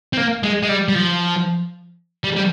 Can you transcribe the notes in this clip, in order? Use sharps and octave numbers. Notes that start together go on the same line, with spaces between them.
C4
A#3
G#3
G#3
G3
G3
F3
G3
G3